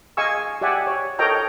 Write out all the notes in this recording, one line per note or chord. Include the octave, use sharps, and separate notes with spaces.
G#4 D#5 F5 G#5 C#6 E6
G4 D5 E5 F#5 G#5
C#5
A4 A#4 C#5 D#5 G5 A#5